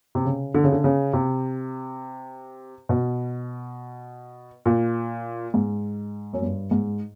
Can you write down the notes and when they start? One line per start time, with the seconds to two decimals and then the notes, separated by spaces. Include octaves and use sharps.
0.15 C3
0.25 C#3
0.54 D3
0.64 C#3
0.72 D3
0.84 C#3
1.13 C3
2.89 B2
4.66 A#2
5.54 G#2
6.33 F#2
6.42 G2
6.71 G#2